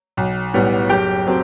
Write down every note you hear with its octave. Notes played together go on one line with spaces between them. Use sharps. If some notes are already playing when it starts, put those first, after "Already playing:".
B1
A2 G3 B3
F#1 G4 G5
F#3 C4